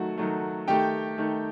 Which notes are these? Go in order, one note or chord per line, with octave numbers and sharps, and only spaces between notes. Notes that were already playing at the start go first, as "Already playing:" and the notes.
Already playing: D#3 F#3 A3 F#4
D#3 F#3 A3
D#3 A3 G4 G5
D#3 A3